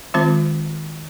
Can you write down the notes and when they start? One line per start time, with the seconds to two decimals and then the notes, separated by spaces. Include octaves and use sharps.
0.14 D#3 G#3 C4 F4 C5